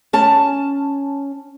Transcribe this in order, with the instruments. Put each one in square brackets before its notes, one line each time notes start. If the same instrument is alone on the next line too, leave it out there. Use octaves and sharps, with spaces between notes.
[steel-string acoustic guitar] C#4 A5